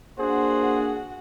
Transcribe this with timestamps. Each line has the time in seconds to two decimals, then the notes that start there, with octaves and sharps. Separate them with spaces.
0.19 A#3 D4 F#4 G#4 C5 F#5